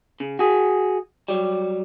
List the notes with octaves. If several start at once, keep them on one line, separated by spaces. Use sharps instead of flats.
C#3
F#4 G#4
F#3 G3